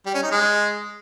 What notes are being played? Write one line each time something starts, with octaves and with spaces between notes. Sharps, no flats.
G3
C#4
D#4
G#3